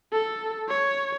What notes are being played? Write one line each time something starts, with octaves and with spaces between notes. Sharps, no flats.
A4
C#5